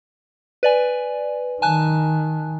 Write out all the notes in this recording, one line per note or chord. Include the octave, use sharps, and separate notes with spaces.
B4 D5 G#5
D#3 G#5 A5 F#6